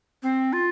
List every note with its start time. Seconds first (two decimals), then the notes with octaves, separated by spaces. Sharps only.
0.23 C4
0.53 F4